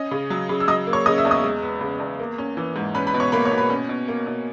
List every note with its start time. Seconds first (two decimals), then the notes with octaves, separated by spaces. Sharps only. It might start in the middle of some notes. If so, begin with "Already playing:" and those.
Already playing: C#4 D#5 D#6
0.11 C#3
0.30 F#3
0.49 C#3
0.60 E6
0.68 F#3 D#5 D#6
0.87 A#3
0.93 C#5 C#6
1.06 C#3 D#5 D#6
1.18 E5 E6
1.25 E2
1.31 D#5 D#6
1.44 G#3
1.62 B3
1.81 C#3
2.00 E2
2.19 A#3
2.38 C#4
2.57 E3
2.76 G#2
2.95 C#4 B4 B5
3.07 B4 B5
3.14 B2
3.20 C#5 C#6
3.32 A#3 B4 B5
3.45 C#5 C#6
3.51 B2
3.58 B4 B5
3.70 C#4
3.89 B2
4.08 A#3
4.27 B2